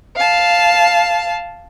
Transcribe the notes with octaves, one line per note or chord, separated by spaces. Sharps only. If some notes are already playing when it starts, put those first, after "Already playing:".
F5 A5